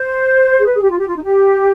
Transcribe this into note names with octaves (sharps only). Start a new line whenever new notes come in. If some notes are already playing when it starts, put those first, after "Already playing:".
Already playing: C5
G#4
B4
G#4
G4
F4
G4
F4
D#4
G4